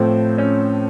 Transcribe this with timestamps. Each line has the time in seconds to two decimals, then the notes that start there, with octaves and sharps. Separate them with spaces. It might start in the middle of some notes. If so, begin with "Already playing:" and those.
Already playing: A2 F3 A3 C4
0.38 C#4